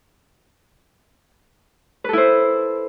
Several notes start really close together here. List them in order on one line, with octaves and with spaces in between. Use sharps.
B4 A4 E4 C5